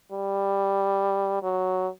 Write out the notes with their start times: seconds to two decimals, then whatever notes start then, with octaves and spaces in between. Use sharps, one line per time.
0.12 G3
1.43 F#3